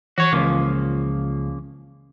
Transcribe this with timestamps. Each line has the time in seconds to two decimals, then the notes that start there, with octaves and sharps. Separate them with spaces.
0.18 E3 F#4 C#5
0.32 C#2 C#3 F3 A#3